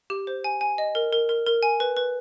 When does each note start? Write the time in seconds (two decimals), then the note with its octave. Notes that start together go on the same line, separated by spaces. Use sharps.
0.10 G4
0.27 C5
0.44 G#5
0.61 G#5
0.78 D#5
0.95 A#4
1.13 A#4
1.29 A#4
1.46 A#4
1.63 G#5
1.80 B4
1.97 B4